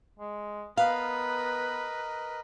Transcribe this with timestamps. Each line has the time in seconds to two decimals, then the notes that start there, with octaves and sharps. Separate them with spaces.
0.19 G#3
0.77 B3 A#4 B4 D#5 F5